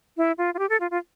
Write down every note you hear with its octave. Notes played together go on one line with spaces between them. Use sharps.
E4
F4
F4
G4
A4
F4
F4